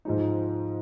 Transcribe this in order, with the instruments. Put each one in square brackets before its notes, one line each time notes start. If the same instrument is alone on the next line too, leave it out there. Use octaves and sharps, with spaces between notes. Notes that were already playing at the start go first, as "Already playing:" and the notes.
[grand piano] G#2 F3 G#3 D#4